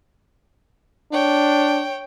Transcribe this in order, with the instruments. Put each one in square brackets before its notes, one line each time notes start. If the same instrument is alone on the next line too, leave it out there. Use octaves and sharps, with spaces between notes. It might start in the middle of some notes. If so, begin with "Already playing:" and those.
[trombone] D4 [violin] C#5 G5